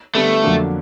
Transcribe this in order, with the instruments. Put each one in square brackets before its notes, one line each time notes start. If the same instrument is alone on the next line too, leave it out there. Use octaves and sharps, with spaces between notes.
[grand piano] D3 G3 B3 [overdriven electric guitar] A3
[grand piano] F2 D3 F#3 A#3 D4